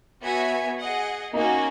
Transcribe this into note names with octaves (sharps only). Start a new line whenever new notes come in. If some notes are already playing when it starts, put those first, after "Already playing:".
B3 F#4 C#5 E5 G#5
G#4 D#5 F#5
A#3 C#4 D#4 F#4